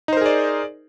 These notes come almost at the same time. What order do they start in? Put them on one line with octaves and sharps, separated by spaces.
D#4 C5 A#4 G#4 D5